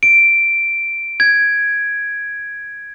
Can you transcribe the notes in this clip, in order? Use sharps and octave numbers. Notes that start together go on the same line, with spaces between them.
D7
G#6